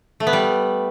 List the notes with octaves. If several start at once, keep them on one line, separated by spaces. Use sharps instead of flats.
A3
B3
G3